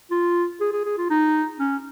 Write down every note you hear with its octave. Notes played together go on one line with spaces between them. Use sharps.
F4
G#4
G#4
G#4
F4
D#4
C#4